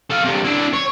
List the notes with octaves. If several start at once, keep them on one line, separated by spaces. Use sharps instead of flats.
A4 F5
C3 D4
D4 E4
C#5